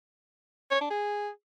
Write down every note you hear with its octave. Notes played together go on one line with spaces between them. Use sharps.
C#5
D4
G#4